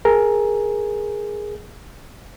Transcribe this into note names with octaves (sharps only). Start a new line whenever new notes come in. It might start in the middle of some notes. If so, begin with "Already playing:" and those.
G#4 A#4